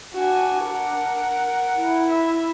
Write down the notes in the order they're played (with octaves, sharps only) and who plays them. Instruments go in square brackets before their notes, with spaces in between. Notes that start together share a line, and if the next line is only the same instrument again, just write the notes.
[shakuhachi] D4 [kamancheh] F#4 G#5
[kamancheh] A#4 F#5
[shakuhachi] E4
[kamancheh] E5